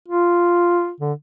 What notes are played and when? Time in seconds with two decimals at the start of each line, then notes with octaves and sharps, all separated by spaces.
0.08 F4
1.00 D3